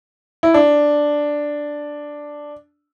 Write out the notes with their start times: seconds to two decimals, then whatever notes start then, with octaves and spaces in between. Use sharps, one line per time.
0.43 E4
0.54 D4